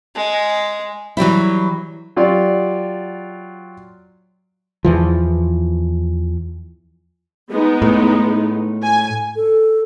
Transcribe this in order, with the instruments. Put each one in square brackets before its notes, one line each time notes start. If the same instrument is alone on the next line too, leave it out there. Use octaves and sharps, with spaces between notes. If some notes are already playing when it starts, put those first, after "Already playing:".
[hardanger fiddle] G#3
[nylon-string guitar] E3 F#3 G3 E4
[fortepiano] F#3 F4 G4 D5
[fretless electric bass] E2 E3 F3
[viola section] G#3 B3 D#4
[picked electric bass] A2
[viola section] G#5
[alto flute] A4